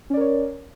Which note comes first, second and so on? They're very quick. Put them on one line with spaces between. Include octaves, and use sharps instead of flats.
C#4 D5 A#4 C#5